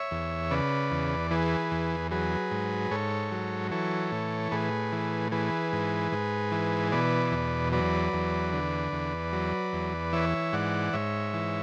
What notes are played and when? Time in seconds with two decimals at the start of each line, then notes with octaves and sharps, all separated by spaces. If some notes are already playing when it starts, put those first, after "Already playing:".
Already playing: C#5 E5
0.11 E2
0.51 C#3 B4 D5
0.91 E2
1.31 E3 G#4 B4
1.71 E2
2.11 F#3 G#4 B4
2.51 G#2
2.91 G#2 A4 C#5
3.32 F#3
3.71 E3 A4 C#5
4.12 A2
4.51 A2 G#4 B4
4.92 E3
5.32 E3 G#4 B4
5.73 G#2
6.12 G#2
6.52 E3
6.92 B2 B4 D5
7.32 E2
7.72 F#3 B4 D5
8.13 E2
8.53 D3
8.92 E2
9.33 F#3
9.73 E2
10.13 E3 C#5 E5
10.53 G#2 D5 F#5
10.93 G#2 C#5 E5
11.34 E3